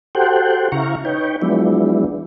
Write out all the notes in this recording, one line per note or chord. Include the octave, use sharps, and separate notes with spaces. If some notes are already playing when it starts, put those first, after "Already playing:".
F#4 G4 A4 C5 F#5 G5
C#3 E4 F5 A#5 C#6
D#4 B4 C#5 G5
F3 F#3 G#3 B3 D4 E4